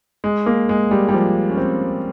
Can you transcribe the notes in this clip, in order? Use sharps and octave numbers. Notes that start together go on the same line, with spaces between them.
G#3
A#3
G#3
G3
G3
F3
C#4
C4